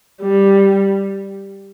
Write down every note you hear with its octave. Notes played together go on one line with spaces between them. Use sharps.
G3